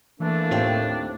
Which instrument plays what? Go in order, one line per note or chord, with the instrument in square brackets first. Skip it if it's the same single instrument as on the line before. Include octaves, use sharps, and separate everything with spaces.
[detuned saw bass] E3 [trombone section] A3 A#3 [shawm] D4
[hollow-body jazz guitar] D#2 C4 F4 [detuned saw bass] A2